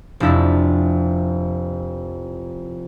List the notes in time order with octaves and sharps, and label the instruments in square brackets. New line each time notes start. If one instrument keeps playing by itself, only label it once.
[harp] F1 F2 D4 E4 E5 B6